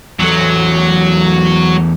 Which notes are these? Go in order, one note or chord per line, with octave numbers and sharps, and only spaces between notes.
E2 F#3 A3